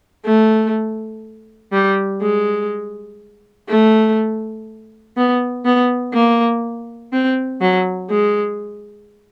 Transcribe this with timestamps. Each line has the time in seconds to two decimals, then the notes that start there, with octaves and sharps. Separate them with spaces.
0.25 A3
1.73 G3
2.22 G#3
3.69 A3
5.17 B3
5.65 B3
6.13 A#3
7.13 C4
7.61 F#3
8.10 G#3